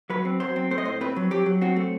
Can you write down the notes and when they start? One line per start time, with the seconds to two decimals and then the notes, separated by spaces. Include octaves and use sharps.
0.10 F#3 B4
0.25 C4
0.40 F#3 C5
0.56 C4
0.71 A3 C5
0.78 D#5
0.85 A2 C5
1.01 C4 B4
1.16 F#3
1.31 F#3 G4
1.46 F#3
1.61 C4 F#4
1.76 A3